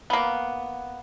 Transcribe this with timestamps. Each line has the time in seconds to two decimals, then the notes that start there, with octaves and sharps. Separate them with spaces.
0.10 A#3 B3